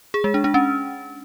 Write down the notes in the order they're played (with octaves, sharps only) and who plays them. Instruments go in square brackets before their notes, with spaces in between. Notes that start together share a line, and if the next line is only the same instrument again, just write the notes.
[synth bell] G#4
G#3
D4
D4
C#4